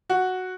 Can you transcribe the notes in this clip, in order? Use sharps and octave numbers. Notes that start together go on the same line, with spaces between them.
F#4